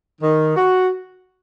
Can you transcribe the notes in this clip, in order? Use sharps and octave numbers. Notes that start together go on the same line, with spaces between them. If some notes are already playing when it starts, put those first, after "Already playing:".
D#3
F#4